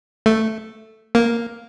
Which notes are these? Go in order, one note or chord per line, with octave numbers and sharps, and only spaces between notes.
A3
A#3